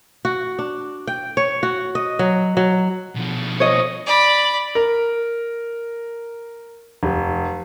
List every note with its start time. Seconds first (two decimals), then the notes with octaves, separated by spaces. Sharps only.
0.25 F#4
0.59 D4
1.07 G5
1.37 C#5
1.63 F#4
1.95 D#5
2.19 F#3
2.57 F#3
3.15 B2 F3
3.60 C#5 D#5
4.06 D5 B5
4.75 A#4
7.03 F1